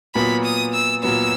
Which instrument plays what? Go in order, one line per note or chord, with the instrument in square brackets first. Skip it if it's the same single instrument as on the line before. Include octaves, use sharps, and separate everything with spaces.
[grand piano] A#2 F#3 B3 [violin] B5
[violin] D#6
E6
[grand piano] A#2 F#3 B3 [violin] E6